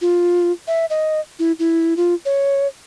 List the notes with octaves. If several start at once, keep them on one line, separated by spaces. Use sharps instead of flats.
F4
E5
D#5
E4
E4
F4
C#5